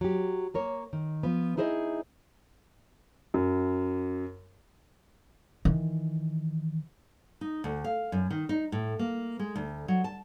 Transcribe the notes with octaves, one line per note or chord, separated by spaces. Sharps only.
F#3 G4
A#3 A#4 C#5
D#3
F3 B3
D#4 E4 G#4 C5 D5 D#5
F#2
D#3 E3
D#4
D2
F5
F#2
D#3
D#4
A2
A#3
G#3
D2
F#3
A5